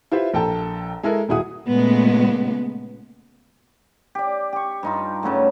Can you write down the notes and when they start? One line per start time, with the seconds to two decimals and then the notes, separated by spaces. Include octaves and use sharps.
0.12 E4 F4 G4 B4 C5 E5
0.34 A#1 A4 G5 A5 A#5
1.03 G#3 E4 A4 A#4
1.29 D#1 B2 E4 G#4 F#5 D#6
1.67 A#2 C#3 G#3 A3 B3
4.15 G4 D5
4.53 G4 C#6
4.83 G2 D#4 F4
5.23 G2 C#3 F#3 A3